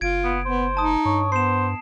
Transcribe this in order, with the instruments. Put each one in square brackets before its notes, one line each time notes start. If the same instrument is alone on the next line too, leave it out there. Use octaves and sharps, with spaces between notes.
[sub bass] F#1 [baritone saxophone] F4 [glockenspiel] G#6 D7
[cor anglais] B3
[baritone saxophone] B3 [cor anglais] C5
[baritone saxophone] D#4 [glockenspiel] A5 D#6
[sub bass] G2 [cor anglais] C#5
[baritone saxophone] B3 [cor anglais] C5 [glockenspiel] C7 E7